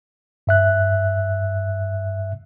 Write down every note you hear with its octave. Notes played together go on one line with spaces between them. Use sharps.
G2 E5 F#6